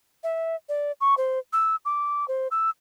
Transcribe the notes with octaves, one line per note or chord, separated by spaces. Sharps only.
E5
D5
C#6
C5
E6
D6
C5
E6